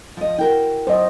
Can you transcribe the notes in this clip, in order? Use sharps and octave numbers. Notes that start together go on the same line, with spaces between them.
F3 D#5
E4 F#4 A#4 G5
F#2 C5 D#5